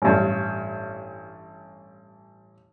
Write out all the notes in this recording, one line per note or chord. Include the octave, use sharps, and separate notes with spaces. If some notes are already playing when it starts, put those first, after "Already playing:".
A1 G2